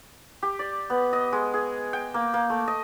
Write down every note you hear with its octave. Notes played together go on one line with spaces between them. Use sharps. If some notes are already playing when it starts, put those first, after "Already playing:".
G4
D5
B3
D#5
G#3
G#4
G5
A#3
A#3
A3
D#5